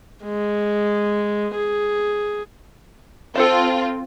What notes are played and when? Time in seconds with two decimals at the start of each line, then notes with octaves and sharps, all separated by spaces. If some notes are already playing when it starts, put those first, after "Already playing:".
0.24 G#3
1.54 G#4
3.36 C4 F4 A4 C5 A5